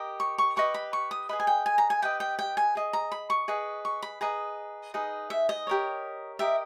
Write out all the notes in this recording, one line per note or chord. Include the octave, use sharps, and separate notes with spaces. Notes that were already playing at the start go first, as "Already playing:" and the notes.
Already playing: G4 A#4 D#5
C#6
C#6
G4 B4 D#5 C#6
B5
C#6
D#6
G#4 B4 D#5 B5
G#5
G5
G#5
A#5
G#5
G4 B4 D#5 G5
G5
G5
G#5
G#4 D#5
A#5
B5
C#6
G#4 B4 D#5
C#6
B5
G#4 B4 D#5 A#5
D#4 G#4 B4 D#5
E5
D#5
G4 A#4 C#5
G4 A#4 D#5 E5